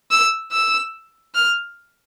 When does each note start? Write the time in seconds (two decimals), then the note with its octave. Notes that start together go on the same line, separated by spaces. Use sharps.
0.11 E6
0.52 E6
1.35 F6